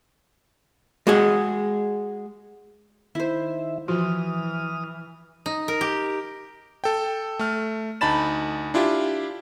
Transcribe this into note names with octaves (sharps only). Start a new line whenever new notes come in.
G#3 F#4 G#4
D#3 E4 C5 E5
E3 F3 F4 F#4 D#6 F6
D#4
A#4
G4
A4 G5
A3 F6
D2 D#4 A5 B5 A6 E7
D4 E4 F4 G4